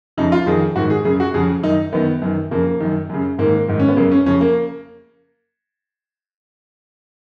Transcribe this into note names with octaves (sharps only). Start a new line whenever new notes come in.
F2 C#3 D#4
F4
F2 D#3 G#4
G#2 D#3 F#4
G#4
F#2 C#3 G#4
F#4
F2 C#3 G#4
F#2 D#3 D#4
F#2 D#3 B3
F#2 D#3
F2 C#3 A#3
F#2 D#3
F#2 C#3
G#2 D#3 A#3
G#2 D#3
C#4
B3
F#2 C#3 A#3
C#4
F2 C#3 C#4
A#3